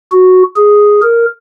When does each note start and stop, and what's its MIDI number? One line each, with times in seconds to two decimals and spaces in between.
0.12 0.43 66
0.56 1.01 68
1.02 1.26 70